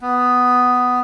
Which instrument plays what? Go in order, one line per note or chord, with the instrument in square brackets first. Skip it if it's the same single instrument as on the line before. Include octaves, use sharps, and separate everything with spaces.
[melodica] B3